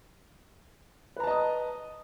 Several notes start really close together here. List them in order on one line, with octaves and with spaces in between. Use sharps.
B4 A#5 A5 D#5 D#6